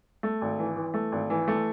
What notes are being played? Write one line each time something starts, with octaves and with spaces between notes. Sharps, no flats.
A3
G#1
E3
E3
A3
G#1
E3
A3